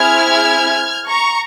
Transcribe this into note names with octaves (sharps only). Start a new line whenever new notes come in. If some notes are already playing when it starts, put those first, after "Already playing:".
Already playing: C4 E4 G#4 F6 G#6
A#5 C#6